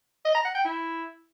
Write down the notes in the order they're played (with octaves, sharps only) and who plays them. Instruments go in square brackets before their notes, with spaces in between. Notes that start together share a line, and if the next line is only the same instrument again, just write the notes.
[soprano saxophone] D#5
A#5
F#5
G5
E4